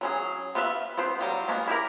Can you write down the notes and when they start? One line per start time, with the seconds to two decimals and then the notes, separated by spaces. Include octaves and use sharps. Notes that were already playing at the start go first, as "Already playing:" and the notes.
0.01 F#3 C#4 G#4
0.55 B3 F4 B4 D5 E5
0.97 B3 C4 B4 C5
1.19 F#3 G3 F4
1.48 G#3 A#3 B3 C#4
1.68 E4 G4 A#4